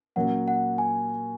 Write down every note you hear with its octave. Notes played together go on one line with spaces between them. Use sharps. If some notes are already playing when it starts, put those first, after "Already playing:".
A#2 F#3 A#3 C#4 F#5
F#5
G#5